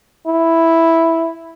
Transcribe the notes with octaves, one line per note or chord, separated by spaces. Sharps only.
E4